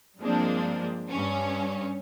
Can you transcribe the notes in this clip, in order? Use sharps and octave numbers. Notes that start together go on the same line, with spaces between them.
G2 F3 G#3 A#3 C4 D4
G2 C#4